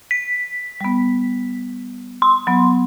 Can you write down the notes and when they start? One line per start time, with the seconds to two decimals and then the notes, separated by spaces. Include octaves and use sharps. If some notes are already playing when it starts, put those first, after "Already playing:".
0.11 B6
0.81 G3 B3
2.22 C6
2.47 F#3 B3